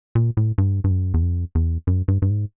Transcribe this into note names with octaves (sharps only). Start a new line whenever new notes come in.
A#2
A2
G2
G2
F#2
E2
F2
E2
F#2
G2
G2
G#2